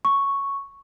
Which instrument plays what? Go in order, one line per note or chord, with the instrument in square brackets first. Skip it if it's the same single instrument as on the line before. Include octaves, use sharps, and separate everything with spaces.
[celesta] C#6